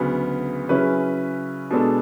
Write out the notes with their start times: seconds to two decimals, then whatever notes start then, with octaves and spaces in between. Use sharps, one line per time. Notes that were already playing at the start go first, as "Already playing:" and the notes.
Already playing: D2 C#3 F#3 B3
0.69 C#3 F#3 C#4 E4 B4
1.71 B2 G#3 B3 D4 A4